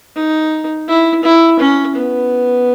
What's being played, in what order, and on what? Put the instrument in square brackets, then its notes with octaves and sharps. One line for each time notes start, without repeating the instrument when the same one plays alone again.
[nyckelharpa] D#4
E4
E4
C#4
B3